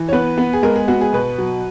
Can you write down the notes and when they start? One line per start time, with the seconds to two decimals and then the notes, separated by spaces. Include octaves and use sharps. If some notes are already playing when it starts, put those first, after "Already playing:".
Already playing: E3
0.08 C#5
0.12 B3 B4
0.38 B3
0.53 G#4
0.63 G#3 A#4
0.76 G#4
0.88 B3 F#4
1.01 G#4
1.13 B2 B4
1.38 F#3